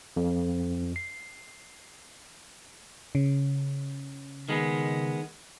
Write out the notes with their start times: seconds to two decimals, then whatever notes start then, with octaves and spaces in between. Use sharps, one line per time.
0.16 F2
0.96 C7
3.15 C#3
4.49 D#3 G#3 B3